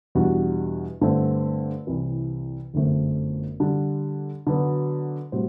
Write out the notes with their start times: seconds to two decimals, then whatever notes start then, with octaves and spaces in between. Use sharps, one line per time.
0.15 E2 B2 G3 D4 F#4
1.01 G2 D3 A3 C4
1.87 C2 C3 E3
2.74 G1 F#2 D3 A3 C4
3.60 D3 G3 D4
4.47 D3 F#3 B3 F#4
5.32 A2 G3 C4 F#4 C5